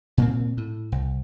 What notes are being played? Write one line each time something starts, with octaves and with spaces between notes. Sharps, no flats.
A#2 A#3 C4
A2
C2